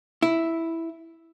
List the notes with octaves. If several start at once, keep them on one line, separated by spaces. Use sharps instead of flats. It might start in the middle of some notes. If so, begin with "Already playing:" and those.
E4